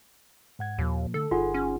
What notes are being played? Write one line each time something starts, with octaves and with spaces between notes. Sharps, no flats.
G#2 F#5 G#6
D#2 A#2 F3 A#3
D3 A3 A4
G1 D#4 F4 G#4 F#5 G#5 C6
C#4